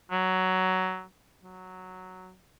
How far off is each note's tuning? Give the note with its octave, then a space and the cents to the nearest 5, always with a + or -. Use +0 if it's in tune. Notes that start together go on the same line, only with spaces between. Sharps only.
F#3 +10
F#3 +0